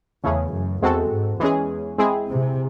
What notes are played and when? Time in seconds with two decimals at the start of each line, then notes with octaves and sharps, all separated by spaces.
0.24 E2 C#3 E3 A3 C#4 G#4
0.53 F#2
0.82 E2 G#3 C4 F#4 A4
1.11 G#2
1.40 E2 E3 G#3 C#4 G#4
1.98 G#3 C4 E4 G#4
2.28 C3